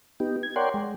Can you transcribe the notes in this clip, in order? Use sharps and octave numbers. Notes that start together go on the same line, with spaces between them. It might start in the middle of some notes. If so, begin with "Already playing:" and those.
B3 D#4 G4
G#6
A#4 C#5 D5 F#5 G5 C6
G#3